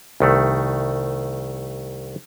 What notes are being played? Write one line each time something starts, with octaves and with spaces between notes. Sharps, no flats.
C2 D#3 A3